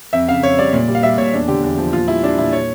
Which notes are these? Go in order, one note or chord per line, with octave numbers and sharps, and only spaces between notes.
F2 E5
C#3 F5
F2 C#5
G3 D5
A#2
G3
F5
G3 E5
A#2 C#5
E2 D4
D3 G4
E2
F3
A#2 F4
G3 E4
G3 D4
A#2 E4
C#5